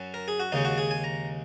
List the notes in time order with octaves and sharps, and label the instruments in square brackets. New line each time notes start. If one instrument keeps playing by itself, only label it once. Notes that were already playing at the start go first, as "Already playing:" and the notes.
Already playing: [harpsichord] F#2 F#3 C#4
A#4
G#4
F#4
D#2 C#3 G#3 C#4 D#4
F#4
G#4
G#5
A#5